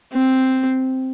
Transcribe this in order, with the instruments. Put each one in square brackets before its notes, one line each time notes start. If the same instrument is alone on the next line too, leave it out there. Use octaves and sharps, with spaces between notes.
[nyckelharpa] C4